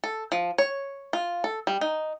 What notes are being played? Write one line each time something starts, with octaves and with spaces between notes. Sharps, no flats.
A4
F3
C#5
F4
A4
G3
D#4